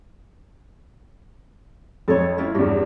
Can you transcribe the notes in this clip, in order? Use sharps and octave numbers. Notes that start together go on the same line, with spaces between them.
F2 A4 C#5
C#4 E4 F4
E2 G2 C#4